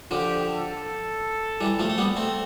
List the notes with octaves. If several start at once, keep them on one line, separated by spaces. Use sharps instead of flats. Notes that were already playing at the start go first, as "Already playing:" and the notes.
D3 F3 G4
A4
E3 G3
F3 A3
A3
G3 B3
A3 C4